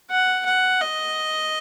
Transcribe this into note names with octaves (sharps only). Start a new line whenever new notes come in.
F#5
F#5
D#5